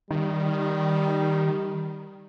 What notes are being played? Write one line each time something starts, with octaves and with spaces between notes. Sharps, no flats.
D#3 G3